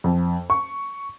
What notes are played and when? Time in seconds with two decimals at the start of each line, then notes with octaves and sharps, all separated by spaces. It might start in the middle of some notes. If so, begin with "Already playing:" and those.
0.04 F2
0.50 C#6